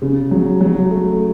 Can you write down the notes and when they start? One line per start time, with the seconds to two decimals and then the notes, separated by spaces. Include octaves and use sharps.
0.02 C#3
0.31 F#3
0.61 F#3
0.91 A3